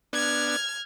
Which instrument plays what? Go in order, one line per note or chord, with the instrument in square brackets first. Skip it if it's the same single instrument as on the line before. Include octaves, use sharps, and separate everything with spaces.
[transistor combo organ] B3 D4 [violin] F6 G#6